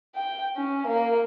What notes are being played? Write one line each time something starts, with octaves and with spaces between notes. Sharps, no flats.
G5
C#4
A#3